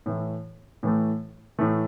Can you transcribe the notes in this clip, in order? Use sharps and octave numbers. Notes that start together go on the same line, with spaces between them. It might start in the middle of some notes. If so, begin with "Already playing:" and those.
A2 E3 A3
A2 E3 A3
A2 E3 A3